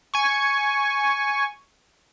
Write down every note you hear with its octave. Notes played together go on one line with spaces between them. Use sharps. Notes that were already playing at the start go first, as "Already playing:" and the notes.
G#5 C#6